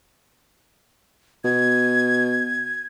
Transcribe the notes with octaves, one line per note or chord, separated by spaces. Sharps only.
B2 G#6